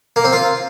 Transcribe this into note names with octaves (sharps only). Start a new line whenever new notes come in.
A#3
C4
F4